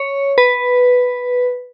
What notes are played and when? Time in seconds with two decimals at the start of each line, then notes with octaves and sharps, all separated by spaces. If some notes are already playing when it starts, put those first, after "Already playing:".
Already playing: C#5
0.38 B4